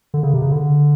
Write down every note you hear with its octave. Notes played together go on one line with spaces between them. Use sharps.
D3
C#3
C3
C#3
D3